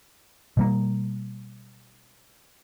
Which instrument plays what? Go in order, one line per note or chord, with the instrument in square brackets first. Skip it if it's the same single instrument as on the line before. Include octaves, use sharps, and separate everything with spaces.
[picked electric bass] B2 G3 A#3